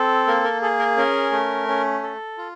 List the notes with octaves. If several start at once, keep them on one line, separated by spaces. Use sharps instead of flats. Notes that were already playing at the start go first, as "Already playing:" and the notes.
Already playing: C4 A4
A#3 A#4
A#4
G#4 A4
A#4
C#4 A#4
A3
C#4
A4
F4